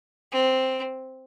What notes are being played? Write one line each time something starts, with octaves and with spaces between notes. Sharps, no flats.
C4